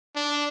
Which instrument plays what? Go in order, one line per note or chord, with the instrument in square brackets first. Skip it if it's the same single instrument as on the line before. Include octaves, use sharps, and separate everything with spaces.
[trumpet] D4